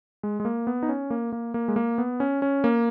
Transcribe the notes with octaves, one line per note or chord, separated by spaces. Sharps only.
G#3
G#3
A#3
B3
D#4
C#4
A#3
A#3
A#3
G#3
A#3
B3
C#4
C#4
A#3